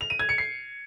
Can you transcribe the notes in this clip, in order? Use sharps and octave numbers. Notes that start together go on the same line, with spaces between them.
F7
D#7
G#6
C#7
C7